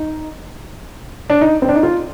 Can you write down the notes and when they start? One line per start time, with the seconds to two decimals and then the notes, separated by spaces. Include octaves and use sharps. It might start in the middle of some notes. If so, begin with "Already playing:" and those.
Already playing: D#4
1.30 D4
1.41 D#4
1.62 C4
1.69 D4
1.75 D#4
1.83 F4